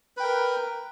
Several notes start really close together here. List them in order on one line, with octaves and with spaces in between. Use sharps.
B4 G5 A#4